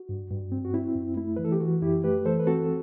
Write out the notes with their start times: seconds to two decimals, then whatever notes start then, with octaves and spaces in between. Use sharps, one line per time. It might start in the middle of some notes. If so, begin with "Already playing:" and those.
Already playing: F#4
0.09 G2
0.30 G2
0.52 C4
0.65 F#4
0.73 C4 E4
0.95 F#2
1.17 A3 E4
1.36 E3 B4
1.45 A4
1.52 G4
1.60 E3 F#4
1.82 F#2 E4 G4
2.04 A3 G4 B4
2.25 E3 A4 C5
2.40 B4
2.47 C4 F#4 A4